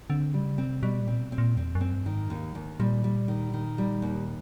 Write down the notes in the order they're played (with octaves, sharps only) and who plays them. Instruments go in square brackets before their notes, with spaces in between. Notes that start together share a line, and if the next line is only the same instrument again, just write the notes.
[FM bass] D3 [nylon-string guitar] C4
[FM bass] C#3 [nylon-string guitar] G3
[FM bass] C3 [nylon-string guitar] C4
[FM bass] B2 [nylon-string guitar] G3
[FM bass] A#2
[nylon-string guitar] C4
[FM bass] B2
[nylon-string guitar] C4
[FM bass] A#2
[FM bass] E2 [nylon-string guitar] C4
[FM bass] F#2
[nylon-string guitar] C4
[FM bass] G2
[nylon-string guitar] D#3
[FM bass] G#2
[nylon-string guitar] D#2
D#2
[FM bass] A#2 [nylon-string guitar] G3
[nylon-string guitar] G3
D#3
D#3
G3
D#2